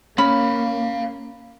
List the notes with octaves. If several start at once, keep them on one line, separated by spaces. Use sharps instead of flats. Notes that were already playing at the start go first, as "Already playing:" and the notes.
A#3 C#4 C#5 F5 B5